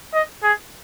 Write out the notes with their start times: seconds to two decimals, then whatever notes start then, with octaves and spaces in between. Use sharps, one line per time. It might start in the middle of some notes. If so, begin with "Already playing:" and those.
0.14 D#5
0.43 G#4